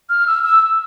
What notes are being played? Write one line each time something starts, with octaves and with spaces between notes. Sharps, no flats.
F6
E6
E6